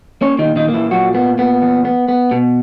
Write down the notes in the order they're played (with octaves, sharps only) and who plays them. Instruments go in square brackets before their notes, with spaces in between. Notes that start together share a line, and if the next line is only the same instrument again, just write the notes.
[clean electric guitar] A#3 C#4 C#5
D#3 D#4
A#2
D#3 D#4
A#3
E3 E4
A#2 F#3 F#4
A#3 B3
A#2 B3
E2
B3
B3
B2